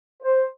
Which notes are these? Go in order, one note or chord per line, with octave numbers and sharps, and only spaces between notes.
C5